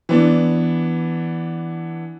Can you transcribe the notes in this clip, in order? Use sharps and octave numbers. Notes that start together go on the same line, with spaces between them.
E3 B3 D4